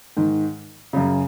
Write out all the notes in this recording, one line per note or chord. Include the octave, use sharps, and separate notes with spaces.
G#2 D#3
F#2 C#3